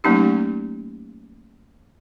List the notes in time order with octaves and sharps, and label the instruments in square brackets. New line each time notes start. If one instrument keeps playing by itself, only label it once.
[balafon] F#3 A3 A#3 C#4 D#4 G4